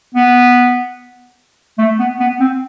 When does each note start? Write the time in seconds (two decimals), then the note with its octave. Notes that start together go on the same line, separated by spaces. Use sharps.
0.14 B3
1.78 A3
1.99 B3
2.20 B3
2.40 C4